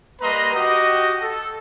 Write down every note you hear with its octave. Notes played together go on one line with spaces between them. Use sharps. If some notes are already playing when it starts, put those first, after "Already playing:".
G3 A#3 B4 D#5 A#5 C6
F#4 G4 D#5
A4